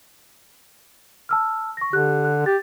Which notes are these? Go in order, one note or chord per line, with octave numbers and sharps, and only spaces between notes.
A5 E6 F6
C#6 A#6
D3 G4 F#6
F#6
G4 A6